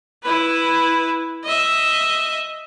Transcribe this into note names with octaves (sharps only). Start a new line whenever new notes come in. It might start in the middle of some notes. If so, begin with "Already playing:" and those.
E4 B4
D#5 E5